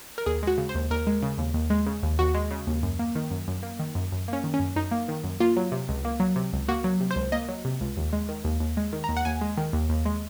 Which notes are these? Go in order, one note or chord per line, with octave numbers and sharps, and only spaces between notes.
A#4
D#2 G#4
G#3 F#4
C#3
C5
D#2
D#2 A#4
G#3
C#3
D#2
D#2
G#3
C#3
D#2
D#2 F#4
G#3
C#3
D#2
F#2
A#3
D#3
F#2
F#2
A#3
D#3
F#2
F#2
A#3 C#4
D#3
C#4
F#2
F#2 D#4
A#3
D#3
F#2
A#3 F4
F#3
C3
C#2
A#3
F#3
C3
C#2
A#3 F#4
F#3
C3
C5
C#2
A#3 D#5
F#3
C3
C#2
D#2
G#3
D#3
D#2
D#2
G#3
D#3
A#5
D#2
F#5
D#2 G#5
G#3
D#3
D#2
D#2
G#3